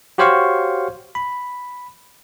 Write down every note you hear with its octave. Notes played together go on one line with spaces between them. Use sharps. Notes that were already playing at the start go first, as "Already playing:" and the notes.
F#4 G4 C5 C#5 F5 C#6
B5